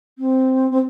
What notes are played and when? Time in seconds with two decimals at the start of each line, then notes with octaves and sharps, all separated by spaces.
0.18 C4
0.71 C4